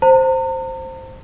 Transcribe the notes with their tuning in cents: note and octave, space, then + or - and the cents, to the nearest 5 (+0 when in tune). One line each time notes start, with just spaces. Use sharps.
C5 +0 A#5 -45